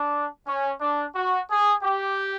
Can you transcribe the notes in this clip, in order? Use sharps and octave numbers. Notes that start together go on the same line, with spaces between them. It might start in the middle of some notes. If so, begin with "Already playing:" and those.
Already playing: D4
C#4
D4
F#4
G#4
G4